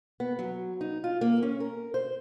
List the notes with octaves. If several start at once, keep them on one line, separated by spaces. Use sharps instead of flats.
B3
F#3
D#4
F4
A#3
C#4
A#4
C5